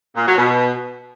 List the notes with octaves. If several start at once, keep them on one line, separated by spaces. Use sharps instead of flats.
A#2
F#3
B2